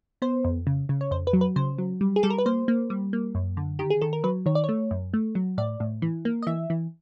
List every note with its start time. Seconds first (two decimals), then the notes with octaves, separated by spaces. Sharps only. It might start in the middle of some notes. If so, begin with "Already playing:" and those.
0.22 B3 C5
0.45 F2
0.67 C#3
0.89 C#3
1.01 C#5
1.11 F2 C5
1.27 B4
1.33 F#3
1.41 B4
1.56 C#3 C5
1.78 F#3
2.01 G3
2.16 G#4
2.23 G3 A4
2.30 A#4
2.38 B4
2.46 A#3 C5
2.68 A#3
2.90 G3
3.13 A#3
3.35 F#2
3.57 D3
3.79 D#3 G4
3.90 G#4
4.02 D#3 A4
4.13 A#4
4.24 F#3 B4
4.46 D#3 C#5
4.55 D5
4.64 A3 C#5
4.91 F#2
5.14 A3
5.35 F#3
5.58 A2 D5
5.80 A2
6.02 E3
6.25 A#3
6.42 D#5
6.47 E3 E5
6.70 E3